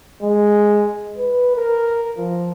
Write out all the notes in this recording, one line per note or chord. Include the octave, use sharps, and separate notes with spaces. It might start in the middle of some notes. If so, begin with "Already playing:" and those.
G#3
B4
A#4
F3